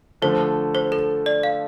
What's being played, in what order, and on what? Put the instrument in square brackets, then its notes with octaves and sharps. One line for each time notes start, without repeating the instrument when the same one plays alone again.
[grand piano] D3 F3 A3 [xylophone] C5
[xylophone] C5
A4
D5
F5